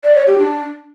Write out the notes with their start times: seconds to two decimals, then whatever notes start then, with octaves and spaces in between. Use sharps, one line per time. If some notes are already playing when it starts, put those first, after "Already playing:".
0.04 D5
0.15 C#5
0.27 G4
0.38 D4